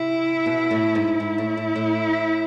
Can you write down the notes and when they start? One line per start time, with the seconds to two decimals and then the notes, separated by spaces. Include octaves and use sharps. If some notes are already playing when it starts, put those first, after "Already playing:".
Already playing: C3 E4
0.46 B2
0.71 A2
0.95 G#2
1.20 G#2 E4
1.38 A2
1.57 A2
1.76 A2